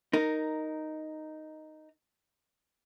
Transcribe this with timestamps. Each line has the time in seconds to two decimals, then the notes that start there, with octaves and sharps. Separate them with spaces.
0.13 D#4 A#4